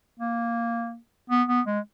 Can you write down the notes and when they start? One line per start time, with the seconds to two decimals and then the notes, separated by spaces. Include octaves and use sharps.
0.20 A#3
1.30 B3
1.48 B3
1.67 G#3